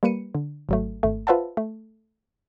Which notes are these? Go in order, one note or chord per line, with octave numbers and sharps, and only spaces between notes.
G3 A#3 B4 C#7 D#7
D3
G#1 F#3 A3
G#1 A3
F4 B4 C5 E5 F#5 A5
A3